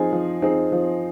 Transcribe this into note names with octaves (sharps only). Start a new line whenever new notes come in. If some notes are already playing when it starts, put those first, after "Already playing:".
Already playing: F3 C4 D#4 G#4
F3
C4 D#4 G#4
F3